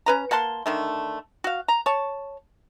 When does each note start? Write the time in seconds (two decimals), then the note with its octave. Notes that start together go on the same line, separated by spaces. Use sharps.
0.06 C#4 B4 A#5
0.31 A#3 F#5 A5 C6
0.66 D3 D#3 A3
1.44 F#4 F5
1.68 A#5
1.86 C#5 A5